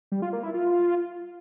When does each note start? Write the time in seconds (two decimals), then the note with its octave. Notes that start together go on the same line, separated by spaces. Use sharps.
0.12 G3
0.22 F4
0.33 A#3
0.43 E4
0.54 F4